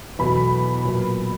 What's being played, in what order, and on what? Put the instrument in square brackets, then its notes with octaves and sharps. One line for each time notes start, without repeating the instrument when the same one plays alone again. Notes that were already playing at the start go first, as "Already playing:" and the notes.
[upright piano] E2 B2 F#3 A3 B5
A#2 F#3 B3